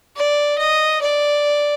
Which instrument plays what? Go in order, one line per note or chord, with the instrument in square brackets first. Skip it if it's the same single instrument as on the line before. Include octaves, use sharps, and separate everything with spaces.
[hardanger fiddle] D5
D#5
D5